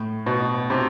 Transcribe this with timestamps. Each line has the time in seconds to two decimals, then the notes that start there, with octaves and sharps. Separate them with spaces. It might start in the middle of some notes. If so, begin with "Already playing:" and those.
Already playing: A2
0.26 B2
0.70 C3